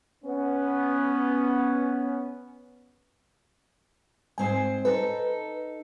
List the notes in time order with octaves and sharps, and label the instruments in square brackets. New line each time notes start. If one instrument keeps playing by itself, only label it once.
[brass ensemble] B3 C#4
[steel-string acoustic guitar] G#2 C4 C5 [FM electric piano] G#5
[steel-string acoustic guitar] D#4 A4 [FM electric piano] B4